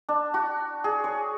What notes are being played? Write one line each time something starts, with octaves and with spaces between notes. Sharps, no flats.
D4
F#4
G#4
C#5